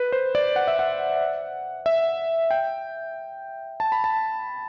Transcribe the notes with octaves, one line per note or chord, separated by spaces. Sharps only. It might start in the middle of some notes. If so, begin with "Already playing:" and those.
Already playing: B4
C5
D5
F#5
E5
F#5
E5
G5
A5
B5
A5